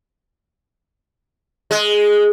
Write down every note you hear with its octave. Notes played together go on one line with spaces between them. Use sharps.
G#3